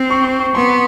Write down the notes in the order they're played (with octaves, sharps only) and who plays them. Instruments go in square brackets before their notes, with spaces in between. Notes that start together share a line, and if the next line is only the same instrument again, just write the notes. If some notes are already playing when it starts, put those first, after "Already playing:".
Already playing: [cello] C4
[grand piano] C#6
C#6
C#6
[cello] B3 [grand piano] C6